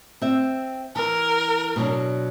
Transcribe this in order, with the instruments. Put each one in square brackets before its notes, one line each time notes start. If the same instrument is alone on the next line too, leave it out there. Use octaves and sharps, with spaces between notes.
[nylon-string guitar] C4 E5
[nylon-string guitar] E3 [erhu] A#4
[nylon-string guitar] B2 F#3 D4